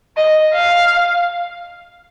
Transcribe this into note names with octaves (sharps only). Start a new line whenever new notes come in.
D#5
F5